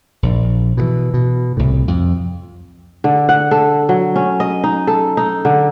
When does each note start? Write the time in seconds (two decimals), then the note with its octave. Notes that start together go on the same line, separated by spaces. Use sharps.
0.23 A#1
0.77 B2 D3 E3
1.14 B2
1.57 C2 A2
1.88 F2
3.04 D3
3.29 F#5
3.51 A4
3.89 F#3
4.16 C#4
4.40 D#5
4.64 D#4
4.87 A4
5.17 D#4
5.45 D3